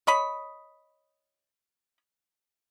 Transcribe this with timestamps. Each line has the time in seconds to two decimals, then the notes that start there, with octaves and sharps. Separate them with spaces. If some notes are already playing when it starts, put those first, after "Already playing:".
0.07 C#5 D#5 B5